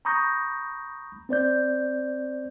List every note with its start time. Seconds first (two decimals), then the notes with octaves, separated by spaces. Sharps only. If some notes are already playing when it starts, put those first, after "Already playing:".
0.05 A#5 B5 C#6 D#6 G6 A#6
1.29 C4 C5 D5 G6